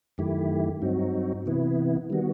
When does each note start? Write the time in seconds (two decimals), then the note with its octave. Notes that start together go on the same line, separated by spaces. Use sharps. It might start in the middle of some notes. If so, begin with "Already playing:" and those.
0.18 F#2 D#3 A3 E4 G4
0.82 G2 F#3 C4 D#4 F#4
1.46 C3 E3 B3 E4
2.10 D#3 G3 B3 F#4